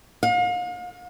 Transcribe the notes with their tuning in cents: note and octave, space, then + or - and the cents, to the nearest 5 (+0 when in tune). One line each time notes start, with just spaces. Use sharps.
F5 +40